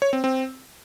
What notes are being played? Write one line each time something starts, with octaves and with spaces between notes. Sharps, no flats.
C#5
C4
C4